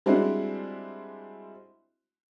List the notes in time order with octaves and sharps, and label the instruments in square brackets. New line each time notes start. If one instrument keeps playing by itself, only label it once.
[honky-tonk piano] G3 G#3 C4 D4 E4 F#4